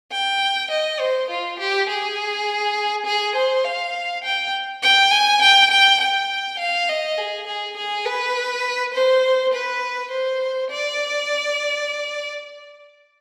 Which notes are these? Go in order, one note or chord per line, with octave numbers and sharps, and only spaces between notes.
G5
D#5
C5
F4
G4
G#4
G#4
C5
F5
G5
G5
G#5
G5
G5
G5
F5
D#5
G#4
G#4
G#4
B4
C5
B4
C5
D5